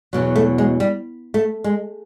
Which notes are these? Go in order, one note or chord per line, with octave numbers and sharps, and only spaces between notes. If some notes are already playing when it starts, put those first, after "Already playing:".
E2 B2 F#3
A3
G#3
G3
A3
G#3